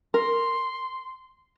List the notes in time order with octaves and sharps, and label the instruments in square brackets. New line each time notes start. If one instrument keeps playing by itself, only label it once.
[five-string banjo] A#4 [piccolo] C6